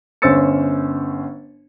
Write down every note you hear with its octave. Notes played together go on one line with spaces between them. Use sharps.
G1 C#4 C5 E6 A6 C#7